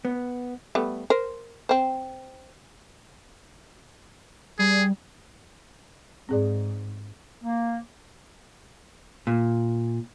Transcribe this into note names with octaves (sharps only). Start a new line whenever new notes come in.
B3
G3 A3 B3
A#4 C5
C4 C5
G3 G#4
G#2 C4 G#4 D5
A#3
A#2